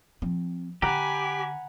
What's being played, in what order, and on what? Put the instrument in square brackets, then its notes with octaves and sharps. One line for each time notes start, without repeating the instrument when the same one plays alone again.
[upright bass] F3 C4
[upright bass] D3 [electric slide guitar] G4 [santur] F#5 A#5 [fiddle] G#5 B5